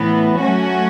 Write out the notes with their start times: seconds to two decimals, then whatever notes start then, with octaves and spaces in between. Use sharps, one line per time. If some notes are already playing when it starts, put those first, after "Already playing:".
Already playing: A2 E3 B3
0.40 F#3 A3 C#4 F#4